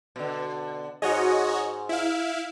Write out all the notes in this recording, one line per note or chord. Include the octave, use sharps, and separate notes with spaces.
B2 D3
G#2 F#4 G#4 C#5 D#5
E4 F5